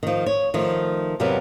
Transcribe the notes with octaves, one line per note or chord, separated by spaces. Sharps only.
D#3 F3
C#5
D#3 F3 A3
F2 C3 F#3 G3 B3 A#4